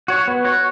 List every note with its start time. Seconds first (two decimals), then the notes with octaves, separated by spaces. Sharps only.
0.08 F#4 C#5
0.28 B3
0.45 F#4 C#5